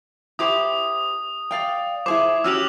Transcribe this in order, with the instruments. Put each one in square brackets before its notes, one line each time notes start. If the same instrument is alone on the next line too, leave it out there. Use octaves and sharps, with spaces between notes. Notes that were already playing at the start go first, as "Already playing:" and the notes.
[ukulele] E4 G4 C5 [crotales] D#6
[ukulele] D5 F5 G5
[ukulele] E4 G#4 C5 [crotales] D6
[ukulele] C#4 F#4 G4 [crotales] E6 F6 F7